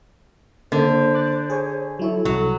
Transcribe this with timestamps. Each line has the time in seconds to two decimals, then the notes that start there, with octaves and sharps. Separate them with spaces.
0.72 D3 A#3 C5
1.15 D6 F#6 A6
1.50 G#4 C#5 G#5
1.99 F#3 E4 A4 C#5
2.25 C2 F#3